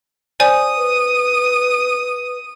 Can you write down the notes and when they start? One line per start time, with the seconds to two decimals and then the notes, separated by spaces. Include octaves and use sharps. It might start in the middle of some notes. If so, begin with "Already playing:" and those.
0.40 C5 D5 G#5 D#6
0.77 B4